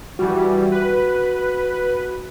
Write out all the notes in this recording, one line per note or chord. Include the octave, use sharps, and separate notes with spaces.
E3 G3 F#4
B4